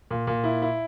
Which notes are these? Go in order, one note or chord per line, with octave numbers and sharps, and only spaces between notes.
A#2
A#2
E4
E4